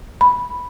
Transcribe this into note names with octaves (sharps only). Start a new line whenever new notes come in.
B5